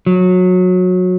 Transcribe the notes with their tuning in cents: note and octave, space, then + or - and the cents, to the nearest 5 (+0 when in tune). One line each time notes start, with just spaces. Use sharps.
F#3 -20